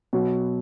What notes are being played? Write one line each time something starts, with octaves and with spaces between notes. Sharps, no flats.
B2 F#3